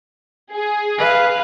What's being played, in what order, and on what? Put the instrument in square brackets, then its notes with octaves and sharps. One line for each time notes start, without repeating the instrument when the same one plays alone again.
[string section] G#4
[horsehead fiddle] B4 F5